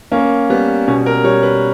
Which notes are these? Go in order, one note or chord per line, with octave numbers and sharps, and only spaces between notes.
A#3 C#4
G3 B3
B2 C#4
A#4
G3 C#5
B4